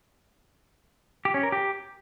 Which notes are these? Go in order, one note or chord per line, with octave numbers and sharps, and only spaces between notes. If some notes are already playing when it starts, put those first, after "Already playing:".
G4
C#4
A#4
G4